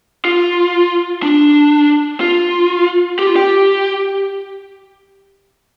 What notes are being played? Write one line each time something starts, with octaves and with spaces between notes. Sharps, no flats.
F4
D4
F4
G4
F4
G4